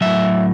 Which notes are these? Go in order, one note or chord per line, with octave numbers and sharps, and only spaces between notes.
A2 F#3 E5